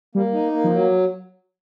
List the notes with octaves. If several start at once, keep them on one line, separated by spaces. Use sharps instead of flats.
G3 A#3
D#4
A#3
F3
F#3